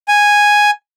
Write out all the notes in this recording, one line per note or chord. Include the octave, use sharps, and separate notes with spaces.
G#5